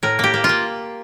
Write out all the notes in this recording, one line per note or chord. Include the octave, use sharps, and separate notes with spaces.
A2 A#4
A#3 G4
A#3
F4
A#3